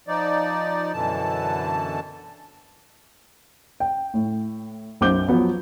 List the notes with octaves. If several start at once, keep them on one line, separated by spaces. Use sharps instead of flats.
F3 D#4 D5
F#2 B2 D3 E3 A5
G5
A2
B1 F#2 C5 D6 G6 G7
F3 F#3 B3